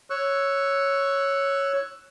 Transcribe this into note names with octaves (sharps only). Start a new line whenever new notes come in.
C#5 C#6 E6 F#6